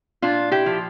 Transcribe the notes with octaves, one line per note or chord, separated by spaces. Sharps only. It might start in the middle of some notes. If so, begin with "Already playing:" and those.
A#2 D4 F4
E4 G4
F3